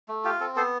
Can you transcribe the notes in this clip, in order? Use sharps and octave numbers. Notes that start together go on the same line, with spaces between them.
A3
F4 G4
C4 A4
B3 A4 C5